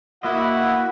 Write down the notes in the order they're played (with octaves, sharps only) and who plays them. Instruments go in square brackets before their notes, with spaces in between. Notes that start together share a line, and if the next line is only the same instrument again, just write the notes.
[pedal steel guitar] A#3 D#5 [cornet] E4 [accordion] F#4 B5 [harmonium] F#5